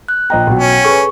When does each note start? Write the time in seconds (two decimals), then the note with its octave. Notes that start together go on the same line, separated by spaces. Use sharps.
0.08 F#6
0.30 A#1 D#5 G5 A#5
0.47 B1 F#3
0.59 C#4
0.85 G#4 A4 B4 C#6